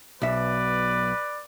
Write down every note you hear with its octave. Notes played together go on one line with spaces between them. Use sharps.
B1 B4 D5 E5